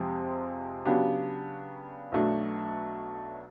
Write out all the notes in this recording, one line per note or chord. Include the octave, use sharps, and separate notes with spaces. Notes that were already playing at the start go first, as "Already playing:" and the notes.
Already playing: F2 C3 F3 G#3 C4
C#3 F#3 B3 D4 G4
B1 B2 F#3 A3 D4